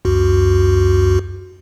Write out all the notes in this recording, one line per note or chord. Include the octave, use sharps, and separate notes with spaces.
C#2 F#2 F#4